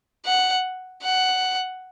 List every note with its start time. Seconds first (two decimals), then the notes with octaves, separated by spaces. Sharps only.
0.26 F#5
1.03 F#5